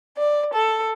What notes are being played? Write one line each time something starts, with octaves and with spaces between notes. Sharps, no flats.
D5
A4